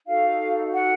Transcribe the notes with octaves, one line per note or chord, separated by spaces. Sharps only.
D#4 F#4 A4 F5
F#5